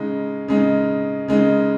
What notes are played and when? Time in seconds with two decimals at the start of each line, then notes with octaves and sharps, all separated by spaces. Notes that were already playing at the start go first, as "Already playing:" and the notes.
Already playing: C#3 G#3 D#4
0.48 C#3 G#3 D#4
1.28 C#3 G#3 D#4